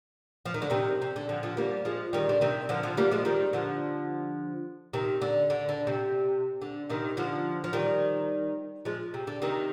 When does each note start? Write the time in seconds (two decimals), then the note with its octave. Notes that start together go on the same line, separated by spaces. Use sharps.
0.46 F3
0.54 D#3
0.62 D3
0.70 C3 D#3
1.02 C3
1.16 D3
1.29 D3 F3
1.43 D3 F3
1.57 G3 A#3
1.85 F3 G#3
2.13 D#3 G3
2.29 D3
2.41 C3 D#3
2.69 D3 F3
2.83 D3 F3
2.97 G3 A#3
3.11 F3 G#3
3.25 D#3 G3
3.53 D3 F3
4.93 C3 D#3
5.22 D3
5.50 D3
5.69 D3
5.87 C3
6.62 D3
6.90 C3 D#3
7.17 D3 F3
7.64 F3
7.73 D#3 G3
8.85 F3 G#3
9.14 C3
9.27 D3
9.42 C3 D#3